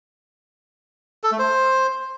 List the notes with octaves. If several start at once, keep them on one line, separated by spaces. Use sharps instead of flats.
A4
A3
C5